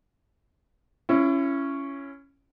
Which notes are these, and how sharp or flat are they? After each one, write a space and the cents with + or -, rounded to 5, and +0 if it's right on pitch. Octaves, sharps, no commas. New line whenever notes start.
C#4 +0 E4 +30